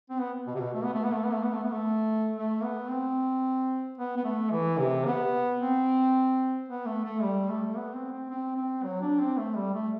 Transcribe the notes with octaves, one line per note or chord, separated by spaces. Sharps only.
C4
B3
B2
C3
B2
A3
B3
A3
B3
A3
B3
A3
B3
A3
B3
A3
A3
B3
C4
B3
B3
A3
E3
C3
B3
C4
B3
A3
A3
G3
A3
B3
C4
C4
C4
C4
F#3
D4
C4
A3
G3
A3